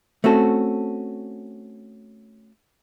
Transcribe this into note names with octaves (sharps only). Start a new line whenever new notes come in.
A3 C4 C#4 F#4 A4